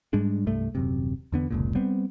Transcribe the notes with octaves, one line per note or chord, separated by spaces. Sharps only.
G#2 G3 G#3 D4
C2 G2 A3
D#1 F#2 C3
E2 D3 B3
F1 C#2 A#2
G3 B3 C4